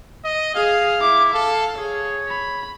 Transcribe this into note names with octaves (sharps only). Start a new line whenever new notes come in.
D#5
G#4 F5
E4 D6
A4 F5
G#4 C#5
B5